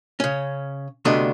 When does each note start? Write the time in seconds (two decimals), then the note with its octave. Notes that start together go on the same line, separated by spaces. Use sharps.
0.20 C#3 C#4
1.05 D2 C3 A3 B3 D4 D#5